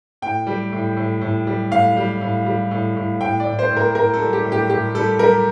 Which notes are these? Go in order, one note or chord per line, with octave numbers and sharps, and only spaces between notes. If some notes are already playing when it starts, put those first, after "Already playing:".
A2 G5
G3
A2
A2
A2
G3
A2 F5
G3
A2
G3
A2
A2
A2 G5
D5
A2
C5
A2
A#4
A2 A#4
A4
G3
G4
A2
G4
A2 G4
G3 A4
G3 A#4